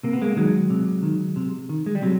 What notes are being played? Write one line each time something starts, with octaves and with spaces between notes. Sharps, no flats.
C3 A#3
B3
G#3 A#3
D#3 F#3 G#3
C3
D#3
C3
D#3
G#3
G3
C3 F#3